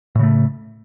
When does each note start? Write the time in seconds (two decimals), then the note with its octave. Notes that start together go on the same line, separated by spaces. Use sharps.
0.15 A2
0.19 C#3
0.23 A3